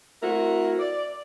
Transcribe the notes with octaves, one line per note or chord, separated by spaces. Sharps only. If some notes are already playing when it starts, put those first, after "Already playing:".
A3 C4 E4 F#4 A#4
D5